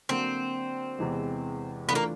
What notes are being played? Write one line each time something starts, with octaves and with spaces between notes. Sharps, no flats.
D3 F#3 A#3 C4 D4 F#4
E2 C3 E3 G#3
E3 A3 B3 D4 F4
A#3